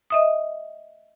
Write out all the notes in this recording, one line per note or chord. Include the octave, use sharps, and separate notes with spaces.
D#5 E5 D#6